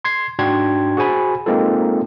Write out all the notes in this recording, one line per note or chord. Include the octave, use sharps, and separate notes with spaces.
C6 G#6 C7
G#2 D4 F#4 G5 C6 G#6
F#4 G#4 C5 G#5 B5
G#3 A#3 C4 D#4 F4 A4